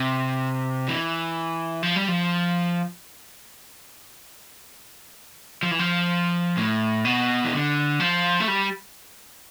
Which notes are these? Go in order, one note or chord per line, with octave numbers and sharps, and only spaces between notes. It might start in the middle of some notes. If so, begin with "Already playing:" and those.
Already playing: C3
E3
F3
G3
F3
F3
E3
F3
A2
B2
E3
D3
F3
A3
G3